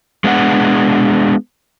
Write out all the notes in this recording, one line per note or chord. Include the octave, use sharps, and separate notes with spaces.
G#3 B3 D4 F#5